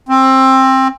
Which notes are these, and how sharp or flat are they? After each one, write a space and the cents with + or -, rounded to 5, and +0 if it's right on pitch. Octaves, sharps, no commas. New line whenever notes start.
C4 +20